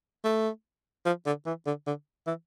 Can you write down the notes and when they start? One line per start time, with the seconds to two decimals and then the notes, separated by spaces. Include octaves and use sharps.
0.24 A3
1.05 F3
1.26 D3
1.46 E3
1.66 D3
1.87 D3
2.27 E3